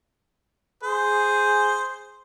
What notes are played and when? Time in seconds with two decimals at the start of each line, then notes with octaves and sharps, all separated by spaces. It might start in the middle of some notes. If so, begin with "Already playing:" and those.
0.83 G#4 C5